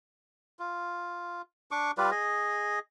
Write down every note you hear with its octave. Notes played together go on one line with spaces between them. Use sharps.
F4
D4 C#6 D6
G3 F4 B4 D5
G#4 D#5